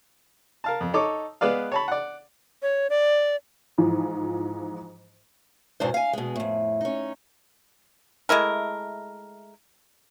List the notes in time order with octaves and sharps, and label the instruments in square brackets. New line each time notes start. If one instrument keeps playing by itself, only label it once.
[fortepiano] A#4 F5 A5
F2
D#4 A4 C#5 C#6 D6
G#3 B3 B4 D5 F5
C#5 A5 B5
D5 F#5
[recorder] C#5
D5
[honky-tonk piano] G#2 E3 F3
[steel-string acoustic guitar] E2 G#2 B2 E3 D4 C5
F5 G#5
B2 G#3
F2 A2
C#4 D#4
[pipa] G#3 A3 E4 A#4